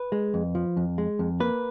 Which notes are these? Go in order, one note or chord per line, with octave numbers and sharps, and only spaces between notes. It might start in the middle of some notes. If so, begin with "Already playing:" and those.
Already playing: B4
G#3
F2
F3
F2
G#3
F2
A#3 B4